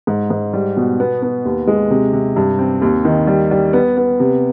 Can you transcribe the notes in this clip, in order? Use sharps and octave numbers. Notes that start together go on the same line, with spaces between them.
G#2
G#2
G3
B2
B3
B3
D#2
G#3
C3
C3
G2
C4
D#2
D#3
G3
G3
B3
B3
C3